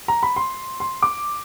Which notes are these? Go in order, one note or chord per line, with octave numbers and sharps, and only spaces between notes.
A#5
B5
C6
C6
D6